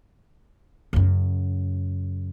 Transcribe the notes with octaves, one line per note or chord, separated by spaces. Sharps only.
F#2 C#3